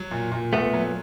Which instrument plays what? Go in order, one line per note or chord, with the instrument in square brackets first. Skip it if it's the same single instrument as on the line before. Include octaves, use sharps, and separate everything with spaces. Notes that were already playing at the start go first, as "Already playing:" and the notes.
Already playing: [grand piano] F#3
A#2
A#2
[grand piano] A#2 [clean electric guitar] A3 B3
[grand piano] F#3